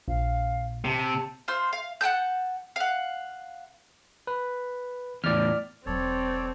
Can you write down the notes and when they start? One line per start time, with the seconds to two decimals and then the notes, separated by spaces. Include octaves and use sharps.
0.08 A#1 F5
0.85 C3 A5
1.48 F4 C5 C6
1.73 F5
2.01 F#5 G5 A5 G6
2.76 F5 F#5
4.27 B4
5.24 E2 A2 D5 F6
5.86 E1 F#3 C4 A4 C#5 D5